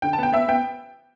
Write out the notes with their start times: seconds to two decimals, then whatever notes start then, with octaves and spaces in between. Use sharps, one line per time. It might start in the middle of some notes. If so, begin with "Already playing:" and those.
0.02 D3 G5
0.13 A5
0.18 B3 G5
0.32 B3 E5
0.48 B3 G5